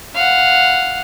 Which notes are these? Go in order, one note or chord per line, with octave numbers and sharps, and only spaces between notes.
F5 F#5